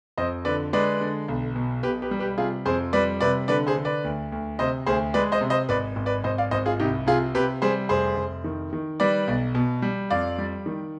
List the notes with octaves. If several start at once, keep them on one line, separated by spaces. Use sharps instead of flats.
F2 C5 D#5
D3 B4 D5
G#3 B4 D5
D3
B1
B2
B1 G4 B4
G4 B4
G3
G4 B4
C3 F4 G#4
F2 G#4 C5
G3 B4 D5
C3 B4 D5
D3 B4 D5
G#4 C5
D3
B4 D5
D2
D2
C3 C5 D#5
D2 G#4 C5
G#3 B4 D5
C5 D#5
C3
C5 D#5
G#1 B4 D5
G#1
B4 D5
G#1 C5 D#5
D5 F5
G#1 C5 D#5
F4 G#4
C2 D#4 G4
C3 F4 G#4
C3 G4 B4
G3 G#4 C5
F1 G#4 C5
F1
D#3
D#3
G3 B4 D5
B1
B2
G3
F2 D5 F5
G3
D#3